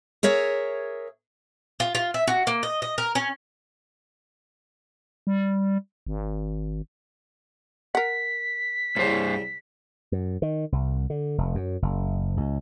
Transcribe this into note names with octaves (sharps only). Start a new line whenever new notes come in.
G#4 A#4 C#5 E5
F4
F4
E5
F#4
A#3
D#5
D#5
A#4
C#4
G3
G#1
A#4 F#5 B6
C2 G2 C#3 C5
F#2
D#3
C2
D3
F1
F#2
F#1
C#2